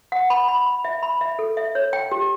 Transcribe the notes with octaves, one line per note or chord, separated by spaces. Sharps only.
F#5
B5
B5
B5
E5
B5
E5
A4
E5
C#5
G5
G4